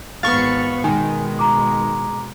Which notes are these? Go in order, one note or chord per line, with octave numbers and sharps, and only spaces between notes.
G#1 B3 F5 C#6 A6
B2 D#3 G#3 G#5
A#5 D6